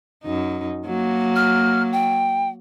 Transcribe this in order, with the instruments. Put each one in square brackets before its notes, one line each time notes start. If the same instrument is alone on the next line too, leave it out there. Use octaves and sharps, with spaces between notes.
[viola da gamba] F#2 D#4
F#3 A#3
[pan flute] F6
G5